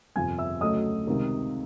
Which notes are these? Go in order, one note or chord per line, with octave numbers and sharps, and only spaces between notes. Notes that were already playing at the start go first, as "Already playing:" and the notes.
G1 F2 C3 F3 G#5 G#6
E5 E6
D2 C#3 F#3 A3 D#5 D#6
C#2 C3 D#3